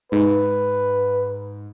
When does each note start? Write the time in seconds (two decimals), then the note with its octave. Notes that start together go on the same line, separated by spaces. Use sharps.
0.12 G#2 B4